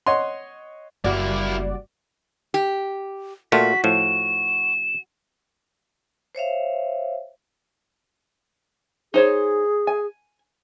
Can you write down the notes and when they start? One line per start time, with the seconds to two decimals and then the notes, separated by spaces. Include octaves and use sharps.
0.06 C#5 D#5 F#5 C6
1.04 F#1 G3 A#3 E4 F#4 D5
2.54 G4
3.52 A#2 A3 F4 F#4 B6
3.84 A2 F3 E7
6.35 C5 C#5 E5 F5
9.14 D#4 G#4 C5 C#5
9.87 G#5